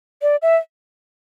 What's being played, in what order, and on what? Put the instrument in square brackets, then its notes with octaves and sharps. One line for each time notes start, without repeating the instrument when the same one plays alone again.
[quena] D5
E5